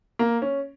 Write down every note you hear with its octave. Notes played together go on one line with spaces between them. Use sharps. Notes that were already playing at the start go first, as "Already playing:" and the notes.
A#3
C#4